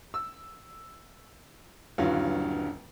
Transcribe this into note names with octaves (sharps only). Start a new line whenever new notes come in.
E6
D#1 G2 D3 E3 F#3 F4